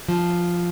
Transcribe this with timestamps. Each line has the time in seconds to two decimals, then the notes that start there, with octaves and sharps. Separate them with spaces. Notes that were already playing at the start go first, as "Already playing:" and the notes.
0.08 F3